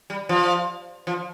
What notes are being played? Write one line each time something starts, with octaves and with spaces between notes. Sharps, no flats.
G3
F3
F3